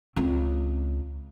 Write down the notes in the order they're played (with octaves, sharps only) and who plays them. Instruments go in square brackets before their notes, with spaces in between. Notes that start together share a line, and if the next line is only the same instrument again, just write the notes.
[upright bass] C#2 C4